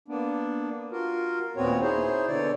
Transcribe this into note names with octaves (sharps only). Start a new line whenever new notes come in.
A#3 B3 D4
F4 F#4 A#4
D#2 A#2 B3 C4 F#4 C#5
D#4 E4 G#4 C5 C#5
B2 D3 C#5 D5